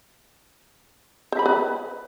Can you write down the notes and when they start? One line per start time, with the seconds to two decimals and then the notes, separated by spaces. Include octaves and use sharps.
1.32 C5
1.39 B5
1.46 B4